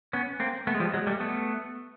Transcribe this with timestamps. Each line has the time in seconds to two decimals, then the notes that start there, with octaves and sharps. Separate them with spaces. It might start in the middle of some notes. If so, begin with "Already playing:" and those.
0.13 B3 C#4
0.40 A#3 C4
0.67 A3 B3
0.75 G#3
0.80 F3 G3
0.94 F#3 G#3
1.07 G3 A3
1.20 A3 B3